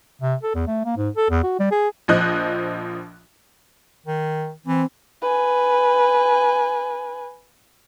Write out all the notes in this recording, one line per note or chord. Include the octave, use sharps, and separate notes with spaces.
C3
A4
E2
A3
A#3
G#2
A4
E2
F#4
G3
G#4
A#1 F3 D#5 F#6
D#3
E3 C4
B4 G#5